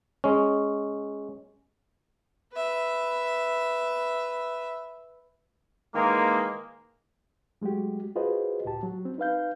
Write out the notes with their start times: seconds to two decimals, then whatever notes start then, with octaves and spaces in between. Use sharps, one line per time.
0.24 G#3 C#4
2.52 B4 E5
5.95 D#3 E3 G#3 A#3
7.62 F#3 G#3 A3 F#4 G4
8.16 F4 F#4 G#4 B4 C5 D#5
8.65 C#2 A2 G4 A5
8.83 F#3
9.05 C4
9.18 D#4 B4 F5 G6